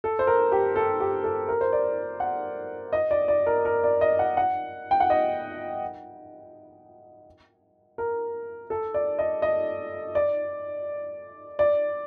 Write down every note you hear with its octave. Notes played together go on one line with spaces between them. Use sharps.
A4
C5
A#4
G4
A4
G4
A4
A#4
C5
D5
F#5
D#5
D5
D5
A#4
A#4
D5
D#5
F#5
F#5
G5
F#5
D#5
A#4
A4
D5
D#5
D#5
D5
D5